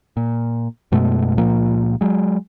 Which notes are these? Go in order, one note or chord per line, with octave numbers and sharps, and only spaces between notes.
A#2
F#2 B2 G#3 A3
C#2 A#2 F3 A#3
F#3 G#3